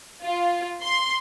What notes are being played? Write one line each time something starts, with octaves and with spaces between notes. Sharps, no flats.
F4
C6